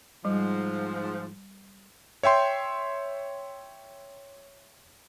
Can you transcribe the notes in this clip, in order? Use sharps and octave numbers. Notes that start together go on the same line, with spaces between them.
G#2 F3 G3
C#5 E5 G5 C6